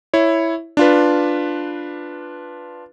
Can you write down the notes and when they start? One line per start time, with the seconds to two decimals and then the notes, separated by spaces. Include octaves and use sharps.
0.14 E4 C#5
0.77 D4 F4 B4